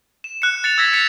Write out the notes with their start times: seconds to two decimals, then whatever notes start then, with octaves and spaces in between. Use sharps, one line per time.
0.24 E7
0.42 F#6 C#7
0.63 F#6 A6 C#7 F7
0.78 E6 G#6 A#6 B6 F7
0.93 A6 B6 C#7 F7